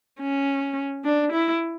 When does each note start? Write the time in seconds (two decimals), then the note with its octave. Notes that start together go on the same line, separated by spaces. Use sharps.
0.20 C#4
1.04 D4
1.32 E4